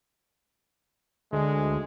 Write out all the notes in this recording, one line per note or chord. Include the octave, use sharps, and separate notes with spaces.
D2 G#3